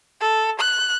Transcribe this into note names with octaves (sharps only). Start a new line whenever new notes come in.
A4
F#6